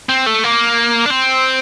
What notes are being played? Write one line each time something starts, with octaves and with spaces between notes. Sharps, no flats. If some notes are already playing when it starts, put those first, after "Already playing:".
C4
A3
A#3
D4
C4